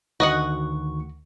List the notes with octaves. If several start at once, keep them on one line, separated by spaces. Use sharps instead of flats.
D2 D#3 F#4 D#5 F#5 C#6